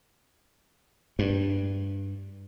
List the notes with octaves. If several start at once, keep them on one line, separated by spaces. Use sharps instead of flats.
G2